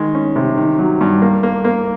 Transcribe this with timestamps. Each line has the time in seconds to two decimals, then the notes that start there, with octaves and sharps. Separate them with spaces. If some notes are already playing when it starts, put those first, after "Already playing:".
Already playing: D#3 G#3
0.15 C#4
0.36 C3
0.57 D#3
0.79 F#3
1.01 G2
1.22 A#3
1.43 A#3
1.64 A#3